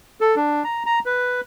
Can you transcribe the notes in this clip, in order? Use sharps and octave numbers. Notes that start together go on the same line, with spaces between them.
A4
D4
A#5
A#5
B4